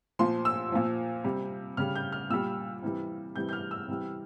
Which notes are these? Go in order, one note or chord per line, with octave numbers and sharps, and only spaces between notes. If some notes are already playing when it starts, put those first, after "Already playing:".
A#2 F3 C6
E6
A#2 F3
C3 G3
C#3 G3 F6
G6
F6
A#2 G3 E6
C3 E3 G3
C3 E3 G3 G6
G6
F6
E6
C3 E3 G3